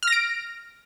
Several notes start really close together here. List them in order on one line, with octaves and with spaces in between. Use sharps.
F6 A#6 D7